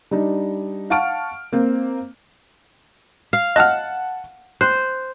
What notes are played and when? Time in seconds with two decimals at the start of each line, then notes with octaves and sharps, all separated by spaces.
0.11 G3 D4 D#4
0.90 F5 F#5 A5 C#6 F6 D7
1.53 A#3 C4
3.33 F5
3.56 D#5 F#5 A5 F6 F#6
4.61 C5 F#6